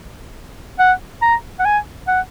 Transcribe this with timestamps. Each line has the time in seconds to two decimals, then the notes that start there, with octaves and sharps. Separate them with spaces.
0.79 F#5
1.22 A#5
1.59 F#5
1.65 G#5
2.07 F#5